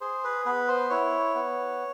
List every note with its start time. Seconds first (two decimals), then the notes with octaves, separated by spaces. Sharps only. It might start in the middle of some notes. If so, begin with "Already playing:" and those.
0.01 G#4 C5
0.24 B4
0.45 B3 B4
0.68 C5
0.90 E4 C#5
1.35 B3